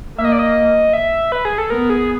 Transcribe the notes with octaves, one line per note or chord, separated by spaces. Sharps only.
A#3 E5
D#5
D5
D#5
E5
B4
G#4
A4
B3 A#4
G#4